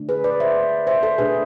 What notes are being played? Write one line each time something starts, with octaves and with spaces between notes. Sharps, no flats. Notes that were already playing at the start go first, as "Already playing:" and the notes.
Already playing: D3 A3 D4
G#4 B4
B4 D5
C5 E5
C5 E5
A4 C5
B2 A3 D4 G#4 B4